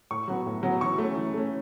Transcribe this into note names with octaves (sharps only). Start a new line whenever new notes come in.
A2 C#6
F#3 B3
A2
F#3 B3
E3 C#6
A3 C#4
E3
A3 C#4